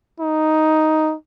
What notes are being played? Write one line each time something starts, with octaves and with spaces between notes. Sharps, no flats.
D#4